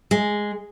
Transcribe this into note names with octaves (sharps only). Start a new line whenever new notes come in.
G#3